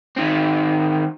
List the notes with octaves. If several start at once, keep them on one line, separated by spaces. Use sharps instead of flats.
D#3 C4